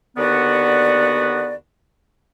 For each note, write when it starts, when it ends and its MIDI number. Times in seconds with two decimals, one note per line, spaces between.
0.17 1.53 39
0.17 1.53 50
0.17 1.53 59
0.17 1.53 66
0.17 1.53 71
0.17 1.53 74